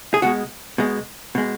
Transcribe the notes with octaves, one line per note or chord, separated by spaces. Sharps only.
G#4
B2 G#3 F#4
B2 G#3
B2 G#3